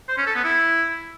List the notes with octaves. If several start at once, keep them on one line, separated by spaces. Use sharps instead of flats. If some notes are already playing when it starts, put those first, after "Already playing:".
C5
C#4
A4
B3
E4